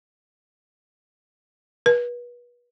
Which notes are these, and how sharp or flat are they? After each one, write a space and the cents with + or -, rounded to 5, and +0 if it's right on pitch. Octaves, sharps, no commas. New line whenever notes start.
B4 -35